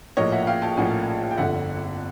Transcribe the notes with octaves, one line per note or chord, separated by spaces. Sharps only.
A#1 A2 F3 A#3 C#5 D#5
E5 F#5
F5 G5
G5 A5
A#1 A2 F3 A#3 F#5 G#5
G5
G1 F2 D3 E5 F#5